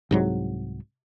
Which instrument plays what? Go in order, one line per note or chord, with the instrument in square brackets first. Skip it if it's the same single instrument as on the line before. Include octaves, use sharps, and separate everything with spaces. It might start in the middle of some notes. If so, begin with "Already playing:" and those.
[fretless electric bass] C2 G#2 F#3